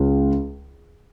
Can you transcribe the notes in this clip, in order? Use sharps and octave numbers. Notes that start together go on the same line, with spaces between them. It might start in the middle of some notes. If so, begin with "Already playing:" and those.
Already playing: C#2